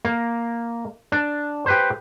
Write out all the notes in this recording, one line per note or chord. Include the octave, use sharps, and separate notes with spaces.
A#3
D4
G4 B4 C5